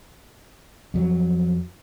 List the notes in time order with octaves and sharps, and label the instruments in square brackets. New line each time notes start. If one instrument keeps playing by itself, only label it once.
[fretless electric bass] F2 F#3